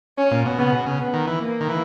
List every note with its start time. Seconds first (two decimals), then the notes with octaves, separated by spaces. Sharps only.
0.18 C#4
0.31 A#2
0.46 B2
0.58 C#3 B3
0.72 B2
0.86 C#3
0.99 B3
1.14 D#3
1.27 E3
1.40 A#3
1.61 D#3
1.68 E3